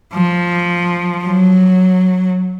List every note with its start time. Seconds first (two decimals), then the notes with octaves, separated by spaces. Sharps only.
0.14 F3
1.24 F#3